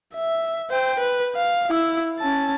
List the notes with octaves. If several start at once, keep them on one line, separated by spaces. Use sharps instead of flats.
E5
C5 G5
B4
F5
E4 E6
C#4 A5